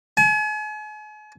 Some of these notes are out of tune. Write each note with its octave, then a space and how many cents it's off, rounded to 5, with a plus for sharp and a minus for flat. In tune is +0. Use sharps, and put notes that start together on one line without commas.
G#5 +40